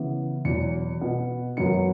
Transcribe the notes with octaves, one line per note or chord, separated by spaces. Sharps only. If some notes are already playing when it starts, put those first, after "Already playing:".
Already playing: C#3 E3 B3
E2 B2 F#3 C#7
B2 B3
F#2 F#3 B3 C#7